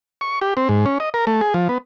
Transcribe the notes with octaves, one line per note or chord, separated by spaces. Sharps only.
C#6
G4
C4
G#2
C#4
D#5
A#4
A3
G#4
F3
B3